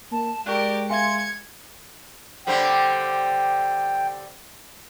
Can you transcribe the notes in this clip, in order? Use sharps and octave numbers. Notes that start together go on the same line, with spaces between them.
A#3 A5
G#3 G4 A#4 D5 C#6 F#6
E5 F5 G#5 C6 G#6 C#7
D3 G3 C4 G5